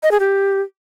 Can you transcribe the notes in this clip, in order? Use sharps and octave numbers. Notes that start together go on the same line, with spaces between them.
D#5
G#4
G4